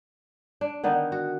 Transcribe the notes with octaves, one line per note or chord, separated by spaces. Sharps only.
D4
D3 D#3 B3 D#4
F#4